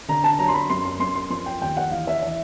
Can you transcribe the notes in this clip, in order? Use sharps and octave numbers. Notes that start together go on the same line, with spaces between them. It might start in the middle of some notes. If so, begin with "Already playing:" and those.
D3 A#5
A5
F#3 A#5
C6
B5
F#2 C6
C6
F#2 C6
C6
F3 C6
G5
D#2 G5
F#5
E3 F5
E5
E3 E5